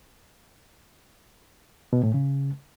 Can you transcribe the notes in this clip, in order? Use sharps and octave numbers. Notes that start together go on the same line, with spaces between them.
B2
A2
C#3